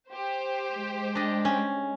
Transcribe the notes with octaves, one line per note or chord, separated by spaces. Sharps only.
G4 C5
G#3
D4 D#5
C#4